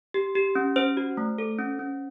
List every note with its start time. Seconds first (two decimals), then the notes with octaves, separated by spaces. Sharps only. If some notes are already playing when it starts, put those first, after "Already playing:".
0.14 G4
0.35 G4
0.55 C#4
0.76 C#4 C5
0.97 F#4
1.17 A3
1.38 A4
1.59 C#4
1.79 C#4